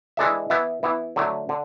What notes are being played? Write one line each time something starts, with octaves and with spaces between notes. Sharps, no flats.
E3 G#3 D4 A4 E5
E3 B3 E4
E3 B3 E4
D3 F#3 A3
D3